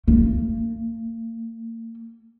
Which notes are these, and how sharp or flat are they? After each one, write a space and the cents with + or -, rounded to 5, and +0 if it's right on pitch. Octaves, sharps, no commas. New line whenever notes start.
A#3 -40